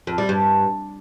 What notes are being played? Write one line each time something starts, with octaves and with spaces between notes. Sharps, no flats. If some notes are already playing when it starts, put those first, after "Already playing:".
F2
G3
G2